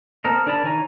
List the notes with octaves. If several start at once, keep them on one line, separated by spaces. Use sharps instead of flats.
C4 A4 A#4 D#5
D4 G#4 A#4 A5 B5
D#3 E3 C#5 G#5 A#5